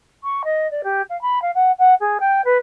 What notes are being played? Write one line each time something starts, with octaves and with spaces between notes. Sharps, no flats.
C#6
D#5
D5
G4
F5
B5
F5
F#5
F#5
G#4
G5
B4